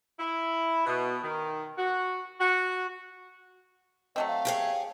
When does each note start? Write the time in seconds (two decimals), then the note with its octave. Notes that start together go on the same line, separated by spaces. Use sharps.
0.18 E4
0.85 B2
1.23 D#3
1.77 F#4
2.39 F#4
4.16 F#3 A3 C4 D#5
4.28 F5
4.45 G4 G#4 C#5